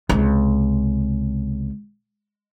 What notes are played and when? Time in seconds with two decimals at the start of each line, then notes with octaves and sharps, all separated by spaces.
0.09 C#2 C3